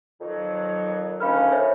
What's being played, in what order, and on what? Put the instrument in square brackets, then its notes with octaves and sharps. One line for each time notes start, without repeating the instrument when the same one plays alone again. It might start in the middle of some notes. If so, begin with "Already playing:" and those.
[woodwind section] F2 D#3 F#3
[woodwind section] D2 D#3 C#4 [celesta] F5 B5 F6
[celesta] C5 C#5 E5